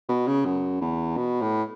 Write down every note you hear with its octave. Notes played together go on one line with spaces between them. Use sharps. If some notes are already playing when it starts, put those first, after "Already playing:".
B2
C#3
F#2
E2
B2
A2